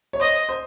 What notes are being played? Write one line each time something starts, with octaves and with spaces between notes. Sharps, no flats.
C#5
C5 D#5
C5